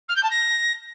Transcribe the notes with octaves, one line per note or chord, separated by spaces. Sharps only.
F6
G6
A5
A#6